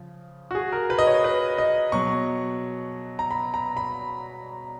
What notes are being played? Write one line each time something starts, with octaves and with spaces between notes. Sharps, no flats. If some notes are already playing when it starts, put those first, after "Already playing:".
Already playing: C#3 F3
F#4
G#4
A#4
B4
D#5
C#5
B4
D#5
B2 F#3 C#6
A#5
B5
A#5
B5